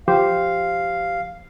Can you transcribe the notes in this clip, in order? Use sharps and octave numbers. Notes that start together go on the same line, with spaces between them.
F3 G4 C5 F5